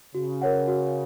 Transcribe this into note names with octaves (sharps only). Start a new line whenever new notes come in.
C#3 F#4
A#4 C#5 F#5
F#4